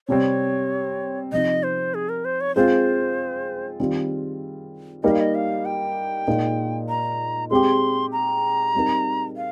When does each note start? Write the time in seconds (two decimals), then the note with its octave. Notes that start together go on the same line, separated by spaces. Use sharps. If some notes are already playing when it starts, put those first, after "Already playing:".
0.08 C3 G3 C4 C#5
1.32 C3 F3 C4 D#4 D#5
1.63 C5
1.94 G#4
2.09 A#4
2.25 C5
2.41 C#5
2.56 G#3 C4 F4 C5
3.80 D#3 G3 C4 F4
5.03 G3 A#3 D#4 G4 A#4 D#5
5.11 F5
5.20 D#5
5.35 F5
5.65 G5
6.27 A#2 G#3 D#4 A#4
6.89 A#5
7.50 G#3 C4 G4 C6
8.12 A#5
8.74 G3 C4 D#4 A#4
9.37 F5